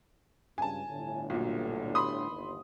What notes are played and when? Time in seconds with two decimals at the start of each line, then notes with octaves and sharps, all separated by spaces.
0.58 C#2 G2 G#5 A5
0.89 G1 A2 D3
1.30 B1 A#2
1.95 B5 C6 D#6
2.30 G1 D#2